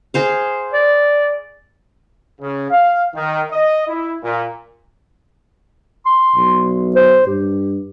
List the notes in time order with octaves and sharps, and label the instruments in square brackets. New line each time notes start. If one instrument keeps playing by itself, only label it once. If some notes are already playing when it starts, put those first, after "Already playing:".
[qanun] G#4 C5 F5
[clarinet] D5
[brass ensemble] C#3
F5
D#3
D#5
E4
A#2
[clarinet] C6
[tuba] B1
[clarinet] C5
[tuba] G2 [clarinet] G4